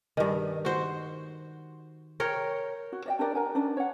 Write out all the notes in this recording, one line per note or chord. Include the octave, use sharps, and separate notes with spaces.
G2 D#3
F#4 C5
A#4 C#5 G5
F#4
D5 D#5 G5
D4 G4 A#4 D5
A#4 F#5 G#5
C#4 D4 D5
C#5 F#5